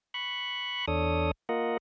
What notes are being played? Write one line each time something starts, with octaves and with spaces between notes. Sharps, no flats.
B5 C#6 F#6
E2 D4 A4 C#5 D#6
A#3 F4 A#4 D#5 F#5